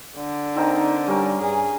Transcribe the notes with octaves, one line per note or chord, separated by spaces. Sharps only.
D3
C4 D#4 A#4 A5
G3 C#4 A#4
G2 G#4